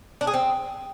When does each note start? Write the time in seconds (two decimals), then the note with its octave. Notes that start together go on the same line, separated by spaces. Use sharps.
0.21 D4
0.27 G#4
0.34 C4